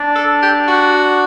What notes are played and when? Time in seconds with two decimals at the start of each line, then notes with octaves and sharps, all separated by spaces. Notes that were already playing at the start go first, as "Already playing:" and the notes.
Already playing: D4
0.15 A4
0.42 G4
0.68 F#4